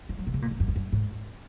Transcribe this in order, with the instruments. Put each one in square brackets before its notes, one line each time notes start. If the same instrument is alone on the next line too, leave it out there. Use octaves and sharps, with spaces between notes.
[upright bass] F3
F#3
B2
C#3
A#2
G#2
F#2
F2
F#2
G#2